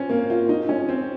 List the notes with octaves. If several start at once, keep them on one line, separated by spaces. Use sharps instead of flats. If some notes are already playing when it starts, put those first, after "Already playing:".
Already playing: C4 C#4
A#3
F4
D#4
C#4
C4